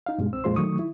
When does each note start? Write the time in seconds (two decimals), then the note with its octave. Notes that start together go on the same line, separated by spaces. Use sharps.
0.06 D#4 F5
0.18 G2 B2 G#3
0.33 C2 C4 E6
0.44 F2 A#2 G#3 F4 C5 C6
0.56 D#3 F#3 A3 C#6 D#6
0.79 E4